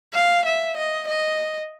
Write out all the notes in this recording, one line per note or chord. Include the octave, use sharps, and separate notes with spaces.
F5
E5
D#5
D#5